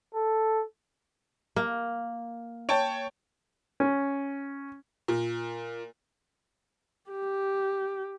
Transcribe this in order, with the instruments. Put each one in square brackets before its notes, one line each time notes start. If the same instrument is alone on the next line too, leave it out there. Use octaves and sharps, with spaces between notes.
[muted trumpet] A4
[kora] A#3
[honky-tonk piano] C#5 G5 A5
[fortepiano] C#4
[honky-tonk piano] A#2
[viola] G4